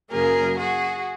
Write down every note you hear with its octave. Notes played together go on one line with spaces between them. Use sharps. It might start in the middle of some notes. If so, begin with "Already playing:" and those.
F#2 C#3 F#3 A#3 G#4 A#4
F#4 G#4